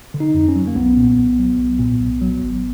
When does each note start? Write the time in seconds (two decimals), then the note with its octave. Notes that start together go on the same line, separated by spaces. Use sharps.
0.14 D3
0.20 D#4
0.34 F2
0.49 C#4
0.56 F#3
0.67 A#3
0.75 B1 B3
0.97 A#2
1.17 B1
1.39 F#3
1.58 B1
1.80 A#2
2.00 B1
2.21 F#3
2.41 G#1